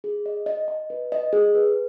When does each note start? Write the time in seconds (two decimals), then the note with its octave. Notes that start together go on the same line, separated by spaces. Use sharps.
0.04 G#4
0.26 D#5
0.46 D#5
0.68 D#5
0.90 B4
1.12 D#5
1.33 G#4
1.55 B4